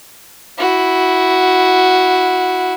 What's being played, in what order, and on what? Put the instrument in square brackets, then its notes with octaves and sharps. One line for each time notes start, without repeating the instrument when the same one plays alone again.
[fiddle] E4 F#4